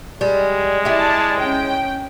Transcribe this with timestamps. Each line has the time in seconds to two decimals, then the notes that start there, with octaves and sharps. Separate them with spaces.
0.21 G3 G#3
0.85 E4 G4 D5 A5
1.38 C#4 G5